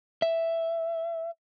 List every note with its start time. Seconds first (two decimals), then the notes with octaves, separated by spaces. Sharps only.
0.22 E5